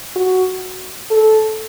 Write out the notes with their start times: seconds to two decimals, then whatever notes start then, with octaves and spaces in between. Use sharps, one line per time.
0.16 F#4
1.11 A4